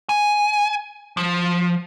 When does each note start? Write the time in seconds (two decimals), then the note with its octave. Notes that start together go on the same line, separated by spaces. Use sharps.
0.09 G#5
1.17 F3